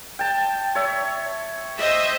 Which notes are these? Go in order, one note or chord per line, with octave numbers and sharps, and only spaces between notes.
G5 A5
C#5 E5
C5 D#5 E5